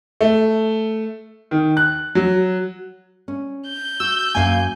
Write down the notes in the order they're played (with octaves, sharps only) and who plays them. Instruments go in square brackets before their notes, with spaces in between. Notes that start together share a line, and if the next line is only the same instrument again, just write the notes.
[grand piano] A3
D#3
F#6
F#3
[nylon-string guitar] C#4
[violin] G6
[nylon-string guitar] F#4 [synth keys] E6
[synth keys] F#2 G#5 [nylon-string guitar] A#3 F5